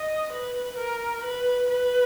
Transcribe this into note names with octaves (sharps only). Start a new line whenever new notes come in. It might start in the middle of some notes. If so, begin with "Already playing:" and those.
Already playing: D#5
B4
A#4
B4
B4